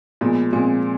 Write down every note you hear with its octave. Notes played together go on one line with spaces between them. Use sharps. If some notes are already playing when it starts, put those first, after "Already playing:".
A#2 F3 G#3 B3
A#2 F3 G#3 C4